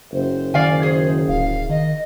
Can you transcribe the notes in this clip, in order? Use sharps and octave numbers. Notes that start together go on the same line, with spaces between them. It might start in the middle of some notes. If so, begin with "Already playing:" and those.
F#1 C5
D#3 D5 F5 G#5
G#4 C5
D1 F5
D#3 D#5